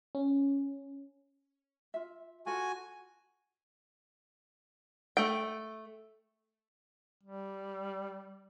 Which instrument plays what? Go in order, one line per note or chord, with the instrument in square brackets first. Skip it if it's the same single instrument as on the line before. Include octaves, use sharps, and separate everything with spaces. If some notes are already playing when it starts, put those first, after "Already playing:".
[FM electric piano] C#4
[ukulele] F4 E5
[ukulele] F4 A4 F#5 [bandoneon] F#4 G#5
[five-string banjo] A3 G5
[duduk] G3